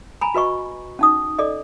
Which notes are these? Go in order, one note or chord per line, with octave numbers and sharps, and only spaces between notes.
G#5 A#5 B5
F#4 B4 D#5 C#6
C#4 D#4 D#6
A4 D5 D#5